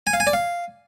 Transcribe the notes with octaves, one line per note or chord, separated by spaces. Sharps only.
G#5
F5
G#5
D5
F5